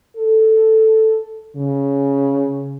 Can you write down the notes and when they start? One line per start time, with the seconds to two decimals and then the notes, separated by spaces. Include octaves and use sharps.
0.17 A4
1.56 C#3